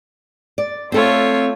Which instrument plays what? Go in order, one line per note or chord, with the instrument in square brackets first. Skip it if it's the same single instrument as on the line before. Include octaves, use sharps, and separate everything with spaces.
[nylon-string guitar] D5
[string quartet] A3 F4 C#5 [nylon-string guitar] C4 A4